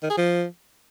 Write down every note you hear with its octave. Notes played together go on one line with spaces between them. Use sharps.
D#3
G#4
F3